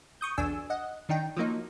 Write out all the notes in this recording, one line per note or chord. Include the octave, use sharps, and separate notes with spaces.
C#6 D#6 G6
B1 E2 D4 G#5 E6
D#5 F#5
D#3 D4 D#4 G5
F3 F#3 A#3 D#4